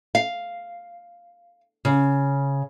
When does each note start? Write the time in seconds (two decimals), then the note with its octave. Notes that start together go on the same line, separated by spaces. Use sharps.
0.15 F5
1.85 C#3